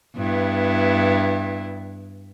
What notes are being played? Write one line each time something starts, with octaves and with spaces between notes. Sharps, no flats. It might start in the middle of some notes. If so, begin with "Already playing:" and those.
G2 B3 E4